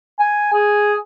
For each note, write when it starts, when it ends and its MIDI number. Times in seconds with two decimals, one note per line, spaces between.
0.20 0.49 80
0.53 0.96 68